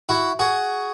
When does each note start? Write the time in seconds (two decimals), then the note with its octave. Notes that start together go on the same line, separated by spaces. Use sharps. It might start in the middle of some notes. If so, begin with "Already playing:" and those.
0.09 E4 F#4
0.39 F#4 G#4